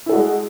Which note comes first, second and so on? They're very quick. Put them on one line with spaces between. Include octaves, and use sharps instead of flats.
E4 A4 F#4 G#3